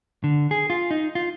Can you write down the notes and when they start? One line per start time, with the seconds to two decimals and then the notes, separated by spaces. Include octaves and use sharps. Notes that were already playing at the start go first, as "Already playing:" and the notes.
0.24 D3
0.51 G#4
0.70 F4
0.91 D#4
1.15 F4